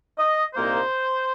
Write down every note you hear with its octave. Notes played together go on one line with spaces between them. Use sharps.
D#5
C2 A#2 A#3 D#4 C5